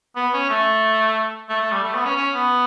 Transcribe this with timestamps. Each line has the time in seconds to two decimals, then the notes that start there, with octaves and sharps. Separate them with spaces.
0.16 B3
0.33 C#4
0.50 A3
1.49 A3
1.61 A3
1.72 G3
1.83 A3
1.95 B3
2.05 C#4
2.16 C#4
2.33 B3